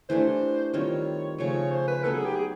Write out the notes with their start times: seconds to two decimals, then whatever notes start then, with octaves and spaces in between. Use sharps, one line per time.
0.09 E3 A3 D4 G4 C5
0.74 D#3 G3 C4 F4 C#5
1.38 C#3 F3 A3 C#5
1.71 C5
1.87 B4
2.04 F#3 B3 D#4 A4
2.14 G#4
2.25 G4
2.35 G#4